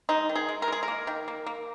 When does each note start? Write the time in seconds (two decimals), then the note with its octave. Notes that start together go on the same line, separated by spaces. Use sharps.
0.09 G#3 D#4
0.29 D#3
0.35 G#4
0.49 G#3
0.62 A#4
0.68 G#3 G#4
0.83 A#4
0.88 A#3
1.07 D#3
1.28 A#3
1.46 A#3